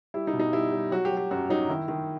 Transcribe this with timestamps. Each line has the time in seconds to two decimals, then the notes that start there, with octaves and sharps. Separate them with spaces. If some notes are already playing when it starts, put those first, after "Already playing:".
0.14 G3 E4
0.27 D#4
0.33 B2
0.40 D#4
0.52 G3 E4
0.72 G3
0.91 F#3 F#4
1.05 G4
1.11 F#3
1.17 G4
1.31 F#2 F#4
1.49 F#3 D#4
1.69 D#3 E4
1.88 D#3